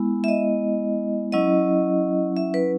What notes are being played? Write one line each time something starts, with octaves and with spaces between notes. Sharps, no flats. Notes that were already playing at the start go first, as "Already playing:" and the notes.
Already playing: G#3 B3 E4
E5
D#5
F#3 C#4 E4 D#5
E5
B4